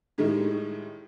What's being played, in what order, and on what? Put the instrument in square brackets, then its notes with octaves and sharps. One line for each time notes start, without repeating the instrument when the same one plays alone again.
[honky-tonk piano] A2 D#3 G3 G#3